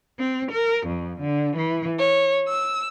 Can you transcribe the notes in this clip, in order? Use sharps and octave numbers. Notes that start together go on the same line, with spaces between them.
C4
A#4
F2
D3
E3
C#5
E6